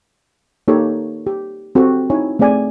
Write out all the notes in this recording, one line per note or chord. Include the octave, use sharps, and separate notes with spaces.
A#3 D#4 G4 A4 C#5
G4
C4 F#4 G4 A4
D#4 E4 C#5 G#5
A3 C4 G#4 D5 G#5